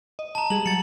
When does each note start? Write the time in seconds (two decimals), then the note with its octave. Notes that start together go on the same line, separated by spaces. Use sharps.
0.19 D#5
0.35 A5 A#5
0.50 G3 G#4 F#7
0.66 F#3 A6 C#7